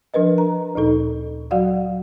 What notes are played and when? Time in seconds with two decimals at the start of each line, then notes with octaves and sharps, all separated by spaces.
0.14 F3 D4 A#4 B4 D#5
0.38 A#5
0.75 D2 A#2 D#4 A4
1.51 F#3 F#4 D5 F5 F#5